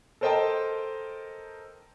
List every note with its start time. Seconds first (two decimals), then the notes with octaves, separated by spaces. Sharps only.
0.21 A4 A#4 C5 D#5 G5 A5